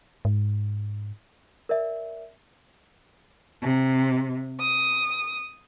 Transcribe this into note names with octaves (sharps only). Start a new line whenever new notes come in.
G#2
A#4 D5 E5
C3
D#6